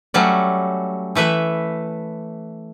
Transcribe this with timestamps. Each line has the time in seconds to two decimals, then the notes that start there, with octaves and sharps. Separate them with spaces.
0.14 F#3 G3 A3 C#4 D5
1.15 E3 A3 B4 E5